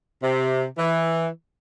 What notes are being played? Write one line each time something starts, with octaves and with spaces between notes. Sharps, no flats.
C3
E3